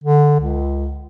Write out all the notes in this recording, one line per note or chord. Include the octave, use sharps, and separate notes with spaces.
D3
C#2